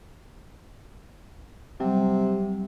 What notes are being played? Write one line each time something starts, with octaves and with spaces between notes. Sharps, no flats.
C3 F#3 G3